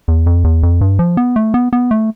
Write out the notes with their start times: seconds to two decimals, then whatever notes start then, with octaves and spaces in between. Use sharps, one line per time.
0.08 E2
0.26 F2
0.44 E2
0.63 F2
0.81 G2
0.99 F3
1.17 B3
1.36 A3
1.54 B3
1.73 B3
1.91 A3